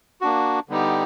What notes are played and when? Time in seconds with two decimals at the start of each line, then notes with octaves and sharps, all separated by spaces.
0.21 A#3 D4 F#4
0.69 D3 G3 B3 D#4 G4